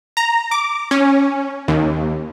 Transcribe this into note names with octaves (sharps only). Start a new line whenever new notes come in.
A#5
D6
C#4
D#2